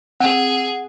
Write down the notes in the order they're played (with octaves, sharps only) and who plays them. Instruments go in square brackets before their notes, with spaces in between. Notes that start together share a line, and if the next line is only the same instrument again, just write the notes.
[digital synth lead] C4 [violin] G#4 [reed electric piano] F#5